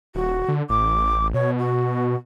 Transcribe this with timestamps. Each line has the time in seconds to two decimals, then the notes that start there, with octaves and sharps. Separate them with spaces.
0.15 D#1 F#4
0.48 D3
0.70 A1 D6
1.34 B2 C#5
1.59 F#4